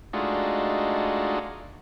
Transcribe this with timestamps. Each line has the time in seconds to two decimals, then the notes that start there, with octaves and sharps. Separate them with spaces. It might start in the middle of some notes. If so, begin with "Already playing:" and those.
0.13 G#3 A3 D4 D#4 F4 F#4